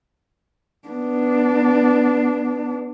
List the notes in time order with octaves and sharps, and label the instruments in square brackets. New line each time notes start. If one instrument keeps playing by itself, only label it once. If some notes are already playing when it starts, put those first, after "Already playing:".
[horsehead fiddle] B3 D4